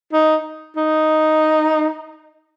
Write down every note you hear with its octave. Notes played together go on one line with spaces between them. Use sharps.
D#4
D#4